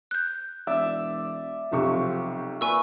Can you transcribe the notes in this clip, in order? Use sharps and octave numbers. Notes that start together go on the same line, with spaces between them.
F#6 G6
E1 D5 E5 E6
B1 C3 F3 C#6
A#2 B4 G#5 C#6 E6